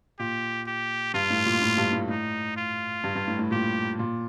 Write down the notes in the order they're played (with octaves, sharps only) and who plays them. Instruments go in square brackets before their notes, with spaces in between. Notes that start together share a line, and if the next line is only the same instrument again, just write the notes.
[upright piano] A#2 [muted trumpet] G4
[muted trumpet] G4
[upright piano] G2 [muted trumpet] F4
[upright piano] A2
A#2
A2
G2
A2
[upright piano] A2 [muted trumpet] D#4
[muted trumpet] F4
[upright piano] G2
G2
A2
A2
[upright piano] A#2 [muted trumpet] G4
[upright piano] A#2